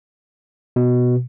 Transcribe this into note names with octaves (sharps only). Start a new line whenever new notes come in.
B2